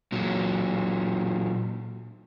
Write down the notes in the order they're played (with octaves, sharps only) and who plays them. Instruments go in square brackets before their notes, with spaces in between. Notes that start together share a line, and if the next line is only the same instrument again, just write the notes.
[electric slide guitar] A#2 F#3